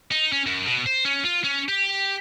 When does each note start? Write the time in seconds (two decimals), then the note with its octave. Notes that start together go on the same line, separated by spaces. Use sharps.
0.12 D#4
0.32 C#4
0.46 F#2
0.66 B2
0.86 C5
1.05 C#4
1.24 F4
1.44 C#4
1.68 G4